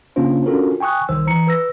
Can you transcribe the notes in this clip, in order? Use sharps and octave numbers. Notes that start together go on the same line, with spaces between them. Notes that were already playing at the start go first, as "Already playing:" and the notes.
C#3 A#3 C#4 D4 F4 C5
C#4 D4 F4 F#4 A4 A#4
G5 G#5 C#6 D#6 F#6
C2 D#3 C5 E6
E3 A#5 C#7
B4 E6 A#6